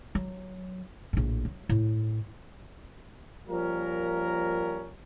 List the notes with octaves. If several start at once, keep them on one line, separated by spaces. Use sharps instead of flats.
F#3
A#1 A2
F#3
A2
F3 G3 A#3 C#4 A#4